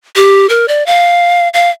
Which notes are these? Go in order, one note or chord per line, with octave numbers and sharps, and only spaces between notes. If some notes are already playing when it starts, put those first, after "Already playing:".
G4
A#4
D5
F5
F5